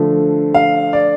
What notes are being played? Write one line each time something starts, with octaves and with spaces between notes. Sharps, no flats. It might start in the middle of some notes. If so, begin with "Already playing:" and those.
Already playing: D3 F3 A3
F5
D5